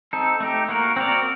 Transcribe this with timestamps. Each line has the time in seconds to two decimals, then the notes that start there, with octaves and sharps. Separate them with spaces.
0.13 C4 D#4 A4
0.40 A3 D#4 G4
0.69 A#3 F#4 A#4
0.96 C4 F#4 A#4 D5